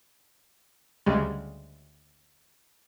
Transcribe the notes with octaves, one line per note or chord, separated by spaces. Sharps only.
D2 C#3 G3 G#3